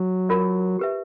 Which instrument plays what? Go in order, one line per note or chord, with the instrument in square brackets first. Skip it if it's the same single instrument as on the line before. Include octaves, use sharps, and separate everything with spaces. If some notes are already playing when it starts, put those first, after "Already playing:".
Already playing: [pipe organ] F#3
[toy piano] F4 A#4 D5
G4 B4 E5